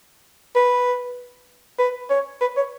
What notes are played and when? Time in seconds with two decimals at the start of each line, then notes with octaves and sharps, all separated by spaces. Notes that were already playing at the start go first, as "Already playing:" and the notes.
0.55 B4
1.79 B4
2.10 C#5
2.41 B4
2.57 C#5